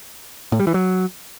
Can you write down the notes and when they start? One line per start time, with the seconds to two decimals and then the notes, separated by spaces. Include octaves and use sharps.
0.52 A2
0.60 G3
0.67 E3
0.74 F#3